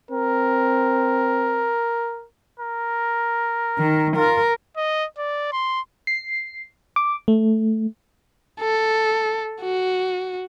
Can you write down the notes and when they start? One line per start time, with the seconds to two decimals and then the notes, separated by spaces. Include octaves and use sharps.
0.11 C4 A#4
2.60 A#4
3.78 D#3
4.17 F4 A#4
4.77 D#5
5.18 D5
5.52 C6
6.07 C7
6.96 D6
7.28 A3
8.60 A4
9.62 F#4